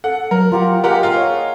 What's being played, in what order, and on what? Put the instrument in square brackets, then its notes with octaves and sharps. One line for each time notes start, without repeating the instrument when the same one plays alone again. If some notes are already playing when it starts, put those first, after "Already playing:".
[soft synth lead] A4 [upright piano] F#5
[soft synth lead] F#3 [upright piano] A#4
[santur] F4 G4 F#5 [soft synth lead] A#5
[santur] G#3 A#3 G5 [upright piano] G4 A#4 F#5 [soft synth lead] G#4
[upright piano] F4 [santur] A#4 F#5
[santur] C#5 F#5 [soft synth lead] D#5